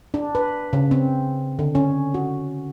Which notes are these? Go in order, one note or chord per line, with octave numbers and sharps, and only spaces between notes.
D4
B4
C#3
C4
D3
C#4
F#4